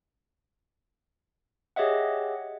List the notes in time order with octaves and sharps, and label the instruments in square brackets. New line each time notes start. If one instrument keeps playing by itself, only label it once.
[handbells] G4 G#4 C#5 D#5 E5 F#5